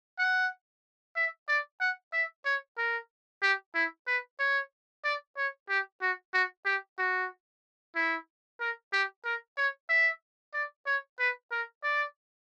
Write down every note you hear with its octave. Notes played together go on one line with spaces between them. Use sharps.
F#5
E5
D5
F#5
E5
C#5
A#4
G4
E4
B4
C#5
D5
C#5
G4
F#4
F#4
G4
F#4
E4
A#4
G4
A#4
C#5
E5
D5
C#5
B4
A#4
D5